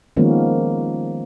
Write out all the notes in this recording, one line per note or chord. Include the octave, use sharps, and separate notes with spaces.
D#3 F3 G#3 A#3 B3 C#4